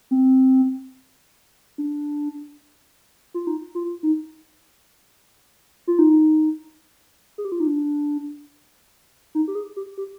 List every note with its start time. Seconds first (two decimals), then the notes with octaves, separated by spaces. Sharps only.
0.11 C4
1.78 D4
3.34 F4
3.47 D#4
3.75 F4
4.03 D#4
5.87 F4
5.99 D#4
7.38 G#4
7.45 G4
7.52 F4
7.60 D#4
7.67 D4
9.35 D#4
9.48 G4
9.55 G#4
9.76 G4
9.98 G4